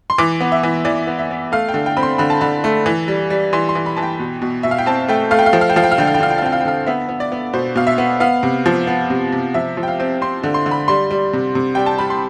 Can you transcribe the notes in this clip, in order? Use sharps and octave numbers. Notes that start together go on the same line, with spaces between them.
C6
E3 D6
B3
E5
E3
E3 D5
B3
E5
B3
A3 F5
G5
D3
G5
C4 B5
C6
D3 B5
A5
D3 B5
A3
E3
G3
G3
E3 C6
C6
E3
B5
E3 A5
G5
B2
B2
B2 E5
F5
G5
C4 A5
A3 G5
A3 F5
G5
F5
F3 G5
F5
G5
F3 F5
G5
F5
D3 G5
F5
G5
D3 F5
G5
F5
C4 G5
F5
G5
D3 F5
B3 E5
B3
D5
B3
B2 C5
B2 F5
E5
B3
B3 F5
C3
F3
B3
C3
C3
F3 E5
F3
G5
F5
C4
C4 C6
D3
C6
D3
B5
G3 C6
G3
C3
C3
G3 G5
A5
G3 B5
C6